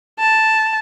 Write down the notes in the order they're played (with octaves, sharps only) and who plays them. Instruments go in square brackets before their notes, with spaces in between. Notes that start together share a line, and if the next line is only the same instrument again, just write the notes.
[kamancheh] A5